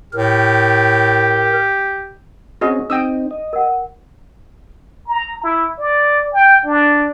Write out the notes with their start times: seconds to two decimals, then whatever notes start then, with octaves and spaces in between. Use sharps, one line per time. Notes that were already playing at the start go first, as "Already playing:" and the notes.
0.13 A2 G4 A#4
2.61 C4 C#4 F#4 G#4 D#5
2.90 C4 D#4 G5 D#6 E6
3.31 D#5
3.53 A#4 F#5
5.08 A#5
5.43 E4
5.79 D5
6.33 G5
6.66 D4